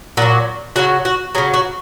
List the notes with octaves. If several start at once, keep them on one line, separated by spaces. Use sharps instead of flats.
A#2 F#3 F#4
C#3 F#3 F#4
F#4
C#3 F#3 G#4
F#4